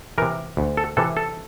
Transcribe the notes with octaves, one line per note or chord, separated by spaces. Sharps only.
C3 E3 A#4
D2
A4
C3 E3 A4
A4